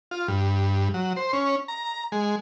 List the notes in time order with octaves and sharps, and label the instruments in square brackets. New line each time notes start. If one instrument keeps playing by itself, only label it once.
[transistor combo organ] F4
G2
F#3
C5
C#4
A#5
G#3